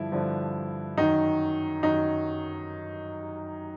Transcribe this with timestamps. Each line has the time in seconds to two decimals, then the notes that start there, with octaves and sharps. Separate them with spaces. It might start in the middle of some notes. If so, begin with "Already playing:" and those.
Already playing: G2 D3 F3 E4
0.12 G2 D3 F3
0.98 F#2 D#3 F#3 D#4
1.83 F#2 D#3 F#3 D#4